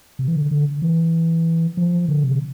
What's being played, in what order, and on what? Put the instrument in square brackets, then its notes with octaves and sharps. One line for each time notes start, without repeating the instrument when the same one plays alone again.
[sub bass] C3
E3
D3
D3
E3
F3
D3
C3